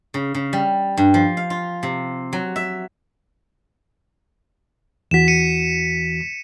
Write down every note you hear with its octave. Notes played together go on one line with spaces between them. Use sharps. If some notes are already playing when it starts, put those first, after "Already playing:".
C#3
C#3
G3
G2
F3
F5
F4
C3
F#3
E5
E2 E3 F#4 B6 E7
C#7 D#7